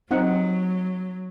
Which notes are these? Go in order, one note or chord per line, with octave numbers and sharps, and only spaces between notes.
F#3 C4 D#4 F#5